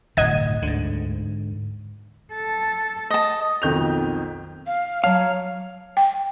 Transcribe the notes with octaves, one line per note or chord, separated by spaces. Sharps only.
D1 G1 C3 D#5 F#5 G#6
D2 G#2 D3
A4
D#5 A5
B1 F2 D#3 G6 F7
F5
F#3 C#5 F5 A5
G5